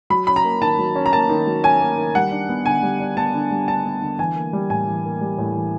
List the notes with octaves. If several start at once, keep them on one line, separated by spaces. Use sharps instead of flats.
F#3 B5
C#4 B5
A#5
A#3
D#3 A5
F#3
C#4
A#5
A#3 A5
D#3
F#3
C#4 G#5
A#3
D#3
G3 F#5
D4
B3
D3 G#5
G3
D4
B3 A5
D3
G3
D4 A5
B3
D3
E3 G#5
A#3
G3
A2 G#5
E3
A#3
G3
A2
E3